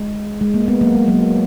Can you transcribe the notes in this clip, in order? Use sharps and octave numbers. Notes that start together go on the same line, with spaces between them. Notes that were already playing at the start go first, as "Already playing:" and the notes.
Already playing: G#3
G#3
A#3
G#3 B3
F#3 A#3
G#3
F#3 A#3